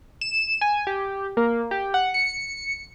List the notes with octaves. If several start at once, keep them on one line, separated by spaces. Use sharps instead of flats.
E7
G#5
G4
A#3
G4
F#5
C#7